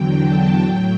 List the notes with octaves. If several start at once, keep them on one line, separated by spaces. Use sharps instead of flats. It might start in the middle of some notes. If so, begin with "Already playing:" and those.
Already playing: E2 D3 F#3 G5
A5
A2 F#3 G5